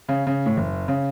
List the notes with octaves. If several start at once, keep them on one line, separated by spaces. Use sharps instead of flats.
C#3
C#3
A2
F#1
C#3